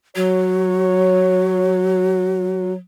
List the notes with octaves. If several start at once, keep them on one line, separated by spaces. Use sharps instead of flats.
F#3 F#4 C#5